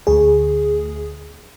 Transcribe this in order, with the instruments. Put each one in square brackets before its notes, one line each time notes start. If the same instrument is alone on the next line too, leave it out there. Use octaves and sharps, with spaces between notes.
[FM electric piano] D2 G#4